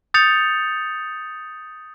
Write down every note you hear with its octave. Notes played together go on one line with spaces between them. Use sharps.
D#6 G6 A6 C#7 F7